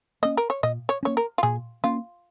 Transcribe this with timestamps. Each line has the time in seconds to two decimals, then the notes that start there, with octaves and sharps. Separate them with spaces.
0.22 A#3 C#4 D#5
0.37 A#4
0.50 C#5
0.63 A#2 D#5
0.89 C#5
1.03 A#3 C#4 C#5
1.17 A#4
1.38 F4
1.43 A#2 G#4
1.84 A#3 C#4 F4